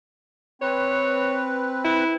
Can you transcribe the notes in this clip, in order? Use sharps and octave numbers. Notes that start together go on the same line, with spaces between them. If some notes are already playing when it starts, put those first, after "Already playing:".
C4 B4 C#5
E4